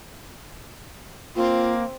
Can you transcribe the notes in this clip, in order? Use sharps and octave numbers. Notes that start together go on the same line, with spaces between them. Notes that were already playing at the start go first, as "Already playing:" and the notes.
A#3 C4 F4